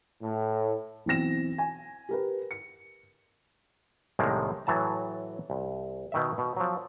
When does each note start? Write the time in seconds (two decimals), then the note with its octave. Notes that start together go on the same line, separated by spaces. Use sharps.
0.22 A2
1.06 B1 E3 C4 A#6 E7
1.58 G#5
2.09 G4 A#4 B4
2.51 C#7
4.19 C2 A2 C3 D#3 G#3 A#3
4.66 A2 E3 F#3 A5 A#5
5.50 C2
6.12 B2 D#3 E5
6.38 B2
6.57 F3 F#3